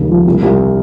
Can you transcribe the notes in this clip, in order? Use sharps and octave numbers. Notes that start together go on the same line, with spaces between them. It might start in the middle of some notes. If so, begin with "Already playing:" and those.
Already playing: D#2 C#3
F3
C2
C2